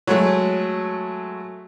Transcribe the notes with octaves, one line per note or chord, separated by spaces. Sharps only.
F#3 G#3 A3